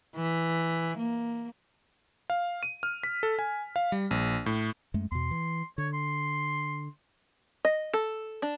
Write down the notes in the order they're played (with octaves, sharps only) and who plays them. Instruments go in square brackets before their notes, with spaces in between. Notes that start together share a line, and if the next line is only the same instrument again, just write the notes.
[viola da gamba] E3
A#3
[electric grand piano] F5
D#7
F6
B6
A4
G#5
F5
G3
A#1
A2
[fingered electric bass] F#2 G#3 A3
[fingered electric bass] E2 B2 [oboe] C6
[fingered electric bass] E3
[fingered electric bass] D3 [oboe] C#5
[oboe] C6
[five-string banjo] D#5
A4
D4